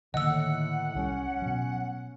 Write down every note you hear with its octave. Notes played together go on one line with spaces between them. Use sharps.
A2 D3 D#3 A#3 D#5 F#5 E6
C2 F#3 G3 C#4
B2 F#3